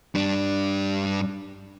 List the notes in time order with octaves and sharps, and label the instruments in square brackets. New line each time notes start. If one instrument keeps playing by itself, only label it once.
[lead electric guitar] G2 D4